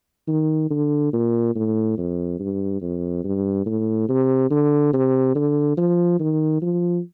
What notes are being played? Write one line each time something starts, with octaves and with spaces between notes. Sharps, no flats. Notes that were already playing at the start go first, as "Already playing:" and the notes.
D#3
D3
A#2
A2
F2
G2
F2
G2
A2
C3
D3
C3
D3
F3
D#3
F3